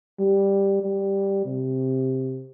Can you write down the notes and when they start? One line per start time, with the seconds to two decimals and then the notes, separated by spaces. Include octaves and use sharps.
0.19 G3
0.82 G3
1.46 C3